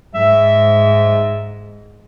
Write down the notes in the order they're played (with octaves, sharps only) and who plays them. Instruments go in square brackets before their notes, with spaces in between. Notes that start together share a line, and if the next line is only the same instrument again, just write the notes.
[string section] G#2 [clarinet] E5